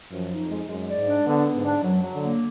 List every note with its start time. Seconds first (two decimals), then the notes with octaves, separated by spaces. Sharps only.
0.12 F#2 F3
0.32 D#4
0.41 F2
0.50 G#3
0.69 F#2 G#3
0.89 D5
0.98 G#2
1.08 D4
1.26 D3 B3
1.46 B3
1.55 G#2
1.65 D4
1.84 F#2 F#3
2.03 F#3
2.13 D3
2.22 A#3